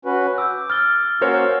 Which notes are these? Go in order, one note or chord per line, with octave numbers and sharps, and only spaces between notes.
C#4 F#4 B4
D6 E6 G6
F6 A6 G7
A#3 C#4 F#4 A#4 C5 C#5